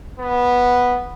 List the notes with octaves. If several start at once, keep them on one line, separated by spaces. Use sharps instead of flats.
B3